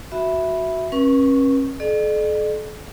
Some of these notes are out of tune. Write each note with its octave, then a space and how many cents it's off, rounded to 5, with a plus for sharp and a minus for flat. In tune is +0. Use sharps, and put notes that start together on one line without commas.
F#4 +0 E5 +0 B5 +0
C#4 -35 B4 -45 C#6 +0
A4 -45 D5 +45